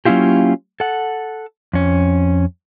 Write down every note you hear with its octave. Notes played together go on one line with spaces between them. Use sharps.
F#3 A#3 C#4 E4 F4 G4
A4 F#5
F2 C#4